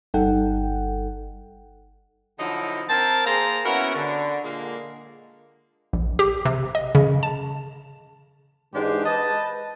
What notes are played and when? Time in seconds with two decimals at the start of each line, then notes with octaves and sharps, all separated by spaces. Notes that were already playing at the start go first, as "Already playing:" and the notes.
0.14 G1 G3 D#4 A4 F#5 G5
2.39 D3 F3 F#3 D#4 E4
2.88 C4 A#4 A5
3.26 A#3 G#4 C5 A#5
3.65 B3 C#4 E4 F#4 A#4
3.95 D3
4.44 A#2 D3 G#3 A#3
5.93 A#1
6.19 G4
6.45 C3
6.75 D#5
6.95 C#3
7.23 A5
8.73 G#2 E3 G#3 D4 G4 C5
9.05 B4 D#5 A5